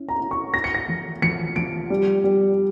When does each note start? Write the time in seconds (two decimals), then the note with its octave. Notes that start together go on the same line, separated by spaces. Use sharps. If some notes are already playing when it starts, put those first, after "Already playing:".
Already playing: C#4 E4
0.09 A#5
0.20 E4
0.31 C#6
0.54 E4 A#6
0.64 C#7
0.74 A#6
0.88 F3
1.22 F3 C#7
1.56 F3 D7
1.90 G3
2.24 G3